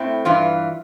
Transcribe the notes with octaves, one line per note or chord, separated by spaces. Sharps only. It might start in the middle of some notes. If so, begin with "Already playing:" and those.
Already playing: A2 C4 E4
G2 E3 F4